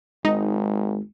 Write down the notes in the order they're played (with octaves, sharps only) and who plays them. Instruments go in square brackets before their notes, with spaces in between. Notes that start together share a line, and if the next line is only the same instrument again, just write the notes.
[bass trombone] G#1 [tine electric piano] G#3 [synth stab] D#4